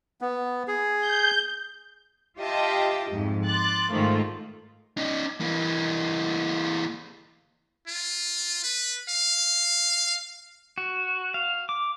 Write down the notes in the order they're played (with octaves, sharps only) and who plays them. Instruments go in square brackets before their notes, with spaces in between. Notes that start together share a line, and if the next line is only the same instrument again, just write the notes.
[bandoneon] B3
G#4
[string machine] G6
[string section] F4 G4 D#5 E5 G5 A5
F2 G#2
C6 D6 F#6 A6
G#2 D#3 F3 A3 A#3 F4
[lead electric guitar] C#4 D#4
E3 A#3
[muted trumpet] F4
B4
F5
[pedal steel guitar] F#4
F5
D6